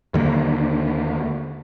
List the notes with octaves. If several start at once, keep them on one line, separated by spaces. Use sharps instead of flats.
D#2 D3 A#3